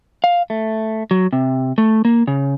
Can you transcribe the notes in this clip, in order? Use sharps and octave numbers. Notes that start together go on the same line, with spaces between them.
F5
A3
F#3
C3
A3
A#3
C#3